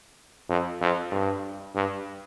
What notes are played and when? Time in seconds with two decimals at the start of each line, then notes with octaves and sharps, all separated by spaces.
0.49 F2
0.81 F2
1.12 G2
1.75 G2